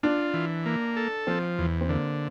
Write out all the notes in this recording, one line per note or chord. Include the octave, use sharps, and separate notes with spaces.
D4 F4
E3
A#3
A4
F3 C4
E2
C4
D3 A#3